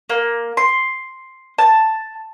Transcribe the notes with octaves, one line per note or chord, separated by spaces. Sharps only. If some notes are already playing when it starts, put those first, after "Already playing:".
A#3
C6
A5